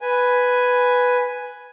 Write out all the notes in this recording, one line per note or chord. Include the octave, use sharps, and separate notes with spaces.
B4 G#5